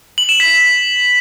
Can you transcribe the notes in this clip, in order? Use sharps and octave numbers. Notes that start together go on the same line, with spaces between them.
F#7
E7
B6